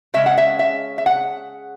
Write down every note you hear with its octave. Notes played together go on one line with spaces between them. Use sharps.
C#3 G#3 C#4 E5
F#5
E5
E5
E5
F#5